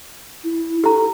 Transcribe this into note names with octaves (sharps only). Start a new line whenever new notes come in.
E4
G4 A4 A#5